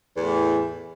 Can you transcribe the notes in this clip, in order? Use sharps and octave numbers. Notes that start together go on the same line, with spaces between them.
E2 A2 E3